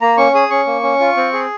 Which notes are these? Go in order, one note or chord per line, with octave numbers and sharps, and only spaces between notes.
A#3 A#5
C#4 C#6
G#4 D#6
C#4 C#6
A#3
C#4
F4
C4
G#4